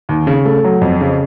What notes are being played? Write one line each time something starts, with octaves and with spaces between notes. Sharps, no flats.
D#2
C#3
A3
F#3
F2
C#3